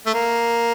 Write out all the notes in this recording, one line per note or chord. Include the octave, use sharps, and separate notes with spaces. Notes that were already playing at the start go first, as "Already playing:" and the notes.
A3
A#3